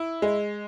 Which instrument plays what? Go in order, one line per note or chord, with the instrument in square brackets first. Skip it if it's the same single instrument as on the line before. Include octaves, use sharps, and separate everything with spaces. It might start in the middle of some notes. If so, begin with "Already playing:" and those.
Already playing: [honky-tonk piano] E4
G#3